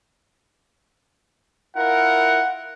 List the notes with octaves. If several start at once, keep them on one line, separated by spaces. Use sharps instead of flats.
E4 F4 A#4 F#5